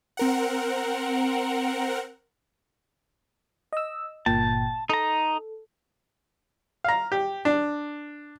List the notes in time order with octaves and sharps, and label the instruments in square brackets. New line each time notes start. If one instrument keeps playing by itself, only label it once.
[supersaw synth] C4 A#4 F#5
[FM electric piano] D#5 E6
[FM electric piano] G1 A#2 G5 [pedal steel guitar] A5
[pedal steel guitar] D#4 A#5 [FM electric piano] A4
[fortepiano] F5 A#5
G4
D4